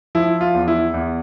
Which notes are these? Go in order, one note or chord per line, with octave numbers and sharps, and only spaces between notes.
F3 E4
F4
E2
E4
E2